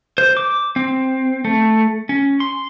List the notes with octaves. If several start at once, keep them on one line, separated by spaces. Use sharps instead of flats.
C5
D6
C4
A3
C#4
C6